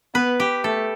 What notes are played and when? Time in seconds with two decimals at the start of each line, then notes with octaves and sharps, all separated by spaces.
0.14 B3 B4
0.40 G4
0.64 A3 A4